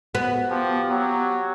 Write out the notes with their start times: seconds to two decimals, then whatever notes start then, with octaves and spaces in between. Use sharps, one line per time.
0.15 B3 F#4
0.50 F3 G4
0.89 F#3 G4